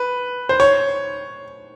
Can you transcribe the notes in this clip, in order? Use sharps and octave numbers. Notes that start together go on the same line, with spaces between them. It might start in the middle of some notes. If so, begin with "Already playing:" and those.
Already playing: B4
C5
C#5